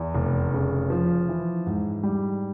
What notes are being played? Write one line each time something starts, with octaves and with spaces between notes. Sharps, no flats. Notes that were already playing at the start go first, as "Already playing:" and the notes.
Already playing: E2
F1
C#3
F3
E3
G#2
G3